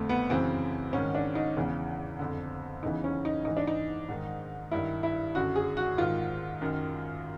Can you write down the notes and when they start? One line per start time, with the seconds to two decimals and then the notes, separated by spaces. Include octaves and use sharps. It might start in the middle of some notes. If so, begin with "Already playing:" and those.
Already playing: F2 D3 A3
0.09 B3
0.30 F#2 C#3 E3 C4
0.93 G#2 D#3 C#4
1.15 D4
1.35 D#4
1.56 E2 C#3 E3
2.19 F2 D3
2.83 E2 C#3 E3 D#4
3.04 C#4
3.25 D#4
3.45 G#2 E3 D#4
3.57 D4
3.67 D#4
4.08 G#2 D#3
4.71 G2 D#3 E4
5.03 E4
5.35 F#2 D3 F#4
5.56 G#4
5.77 F#4
5.98 G#2 D#3 F4
6.61 F#2 D#3